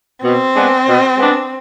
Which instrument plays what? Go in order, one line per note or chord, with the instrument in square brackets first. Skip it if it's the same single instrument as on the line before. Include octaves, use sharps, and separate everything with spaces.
[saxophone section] B2 [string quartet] C4
[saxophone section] G#3 B3 D4
B2
G#3 B3 D4